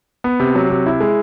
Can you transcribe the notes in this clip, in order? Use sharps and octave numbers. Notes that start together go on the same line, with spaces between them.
B3
C3
F#3
C3
E4
G#3